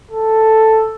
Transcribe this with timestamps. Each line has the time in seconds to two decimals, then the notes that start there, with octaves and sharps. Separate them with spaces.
0.11 A4